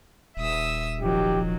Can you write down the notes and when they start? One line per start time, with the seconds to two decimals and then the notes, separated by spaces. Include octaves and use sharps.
0.37 D#1 E5 D#6 E6
1.01 G#1 D#3 F3 F#3 G4